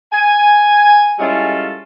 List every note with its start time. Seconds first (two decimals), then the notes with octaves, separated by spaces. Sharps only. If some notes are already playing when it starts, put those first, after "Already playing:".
0.12 G#5
1.19 G3 G#3 C#4 E4 F4 A4